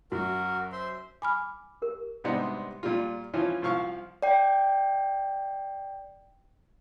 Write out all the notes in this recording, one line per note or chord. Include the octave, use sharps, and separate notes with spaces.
F#2 F#4 A#4
C5 E5 C6
G#5 B5 D6 F6
G4 A#4
G#2 C3 G3 B3 D4 D#4
A#2 G3 F4
E3 F3 C#4 F4
C2 F3 F5 C#6 F6
D5 G5